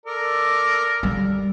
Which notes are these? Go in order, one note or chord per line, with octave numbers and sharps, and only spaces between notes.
A4 A#4 D5
G3